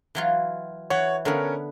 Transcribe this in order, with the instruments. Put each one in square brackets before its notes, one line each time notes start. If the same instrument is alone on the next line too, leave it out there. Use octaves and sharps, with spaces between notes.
[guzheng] E3 F#3 F4
[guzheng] E3 [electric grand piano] C#5 F#5 C#6
[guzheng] D3 B3 [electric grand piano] C#4 A#4 C#5